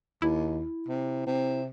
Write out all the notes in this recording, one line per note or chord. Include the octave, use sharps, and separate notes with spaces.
D#2 E4
C3
C3